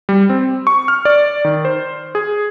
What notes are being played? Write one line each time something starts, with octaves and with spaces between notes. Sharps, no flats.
G3
C4
C#6
F6
D5
D#3
C5
G#4